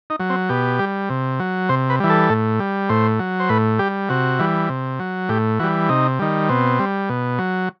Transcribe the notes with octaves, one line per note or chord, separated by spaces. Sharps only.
D#4
F#3
C4
B2 G4
G3
C3
F#3
C3 C5
B4
E3 G3
A4
A2
G3
A2 C5
F#3
C5
A2 B4
G3 G4
C3 F#4
E3 G3
C3
F#3
A2 G4
E3 G3 F#4
C3 D#4
D#3 G3
B2 C4
G3
B2
F#3